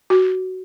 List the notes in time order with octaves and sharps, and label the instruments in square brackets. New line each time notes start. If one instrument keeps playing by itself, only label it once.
[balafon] F#4